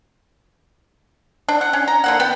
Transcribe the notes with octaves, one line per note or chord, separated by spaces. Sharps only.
D4
F#5
C#4
A#5
D3 A#3 F#5
B3 G5